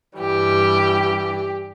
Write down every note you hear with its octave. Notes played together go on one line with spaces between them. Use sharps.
G2 E3 G3 G4